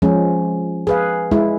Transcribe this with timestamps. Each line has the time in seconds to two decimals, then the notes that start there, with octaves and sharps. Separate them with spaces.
0.02 F3 G#3 C#4
0.87 G#4 B4 F5
1.31 G#3 E4